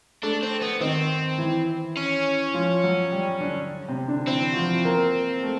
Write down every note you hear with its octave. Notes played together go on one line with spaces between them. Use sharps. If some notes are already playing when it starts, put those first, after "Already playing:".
A3 D4 A4
C4
B3
D#3 C4 D#4
E3 E4
C#4
F3 F4
F#3 F#4
G3 G4
D3 D4
C3 C4
D3 D4
E3 C4 E4
F#4
F3 F4
A#3 A#4
A3 A4